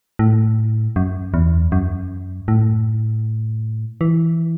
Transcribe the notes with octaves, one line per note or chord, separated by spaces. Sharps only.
A2
F#2
E2
F#2
A2
E3